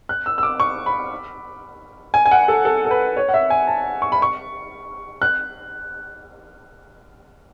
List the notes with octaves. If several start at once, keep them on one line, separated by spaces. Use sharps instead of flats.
F#6
E6
E6
D6
C#6
B5
G#5
G#5
F#5
A4
A4
A4
B4
C#5
F#5
E5
G#5
A5
C#6
B5
C#6
F#6